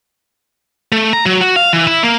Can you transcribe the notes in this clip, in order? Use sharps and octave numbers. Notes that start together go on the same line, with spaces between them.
A3
A#5
F#3
F#4
F5
E3
E4
A#3